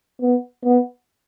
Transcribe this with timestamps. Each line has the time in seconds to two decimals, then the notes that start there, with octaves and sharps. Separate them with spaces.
0.22 B3
0.65 B3